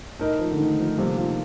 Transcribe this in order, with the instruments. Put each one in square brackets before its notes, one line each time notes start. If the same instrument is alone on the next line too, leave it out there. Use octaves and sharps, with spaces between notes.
[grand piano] A2 A3 D#4 A#4 D#5
[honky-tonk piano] F3
D3
D#3
F3
[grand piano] C3 F3 A#3 [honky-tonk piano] G3
[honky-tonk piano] F4